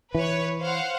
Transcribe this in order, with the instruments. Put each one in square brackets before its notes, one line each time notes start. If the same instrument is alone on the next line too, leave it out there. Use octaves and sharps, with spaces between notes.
[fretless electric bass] E3 [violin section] B4 C#5
[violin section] C5 F5 F#5